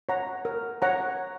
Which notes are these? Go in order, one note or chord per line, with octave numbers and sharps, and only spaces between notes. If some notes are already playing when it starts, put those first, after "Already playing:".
C#5 F#5 A#5
A#4
C#5 F#5 A#5